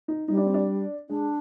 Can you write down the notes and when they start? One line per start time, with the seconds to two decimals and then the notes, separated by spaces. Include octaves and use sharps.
0.08 D#4
0.28 G3 D#4
0.37 D4
0.46 C4
0.54 D4
1.09 G#3 D4